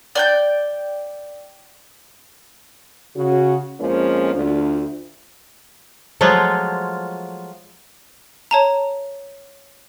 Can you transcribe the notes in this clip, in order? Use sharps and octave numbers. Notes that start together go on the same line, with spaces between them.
D5 G5 G6
C#3 F#4
F2 F3 G#3 A#3 C#4
D2 D4 F4
F3 F#3 G#3 A3 F4
C#5 A5 A#5